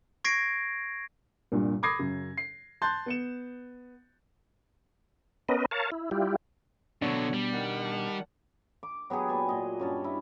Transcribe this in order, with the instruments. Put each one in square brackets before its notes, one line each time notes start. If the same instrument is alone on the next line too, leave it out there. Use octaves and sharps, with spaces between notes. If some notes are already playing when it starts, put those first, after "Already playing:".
[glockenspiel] C#6 G#6 A#6 C7 D7
[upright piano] C2 G2 A#2
B5 D6 D#6 G#6 A#6 C7
F#2 C#3
C7
A5 C6 F#6 G6 A6
B3 C#7 E7
[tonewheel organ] B3 C#4 A#4 B4 D#5
A#4 C#5 F5 A5
E4
G3 E4 F4 G4
[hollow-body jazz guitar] B2 D4 [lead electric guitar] D3 F#3 [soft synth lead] B3 [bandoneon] A4 C#5 F#5
[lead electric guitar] G3
[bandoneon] D#3 F#5
[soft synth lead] A5
[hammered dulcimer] D6
F#3 B3 G4 G#4
A#2 B4 G#5 A5
A#2 D#5
G2 C#4 A5
E4